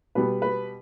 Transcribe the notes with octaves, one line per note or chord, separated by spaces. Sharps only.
B2 G3 B3 B4
B4